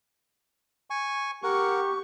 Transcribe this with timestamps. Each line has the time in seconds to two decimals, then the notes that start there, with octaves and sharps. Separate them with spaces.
0.90 G#5 C#6
1.44 G4 A#4 F#5 C#6